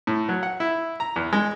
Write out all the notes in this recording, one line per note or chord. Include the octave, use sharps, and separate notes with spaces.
A2
F#3
F#5
E4
A#5
E2
G#3